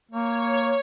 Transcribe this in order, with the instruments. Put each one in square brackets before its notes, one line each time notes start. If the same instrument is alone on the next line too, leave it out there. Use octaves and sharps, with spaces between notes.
[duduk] A#3 [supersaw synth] C#5